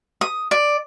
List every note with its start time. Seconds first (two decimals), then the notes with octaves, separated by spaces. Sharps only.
0.21 D#6
0.51 D5